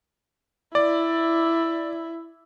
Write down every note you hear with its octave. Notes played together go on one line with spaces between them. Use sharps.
E4 D5